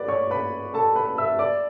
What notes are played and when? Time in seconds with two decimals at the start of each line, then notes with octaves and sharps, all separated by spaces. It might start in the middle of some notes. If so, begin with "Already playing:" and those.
Already playing: B4 D5 D6
0.08 C#5 C#6
0.31 B4 B5
0.74 A4 A5
0.96 B4 B5
1.18 E5 E6
1.39 D5 D6